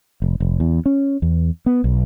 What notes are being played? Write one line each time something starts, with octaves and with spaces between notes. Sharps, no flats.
F1
F1
E2
C#4
E2
B3
B1